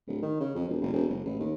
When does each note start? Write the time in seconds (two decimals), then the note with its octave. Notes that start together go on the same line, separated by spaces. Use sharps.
0.08 D1
0.23 D#3
0.40 C#3
0.55 F2
0.68 E1
0.81 F#1
0.93 E1
1.08 F#1
1.25 A1
1.39 D#2